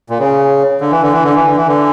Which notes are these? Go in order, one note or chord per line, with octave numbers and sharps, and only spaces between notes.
A#2
C#3
D3
E3
D3
E3
D3
E3
D3
E3
D3